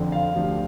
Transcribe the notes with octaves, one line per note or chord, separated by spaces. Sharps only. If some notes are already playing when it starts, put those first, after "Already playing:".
Already playing: F2 D3 F3 C4
F5
D2 C3 F3 D4